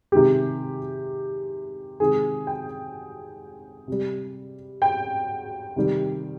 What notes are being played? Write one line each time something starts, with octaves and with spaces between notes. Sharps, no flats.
C3 D#3 G#3 G4
C3 D#3 G#3 G#4
G5
C3 G3
G5
C3 D#3 G3